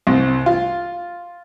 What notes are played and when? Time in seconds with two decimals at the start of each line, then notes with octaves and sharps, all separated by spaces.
0.07 C2
0.46 F4